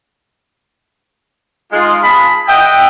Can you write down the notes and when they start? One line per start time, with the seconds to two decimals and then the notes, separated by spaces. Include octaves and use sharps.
1.72 G#3 D#4 F4
2.02 G#4 A5 B5
2.47 D#5 E5 F#5 G5